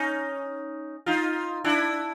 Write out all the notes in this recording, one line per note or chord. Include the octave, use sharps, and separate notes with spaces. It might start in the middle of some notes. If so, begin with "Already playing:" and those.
Already playing: C#4 D#4
D#4 F4
D4 E4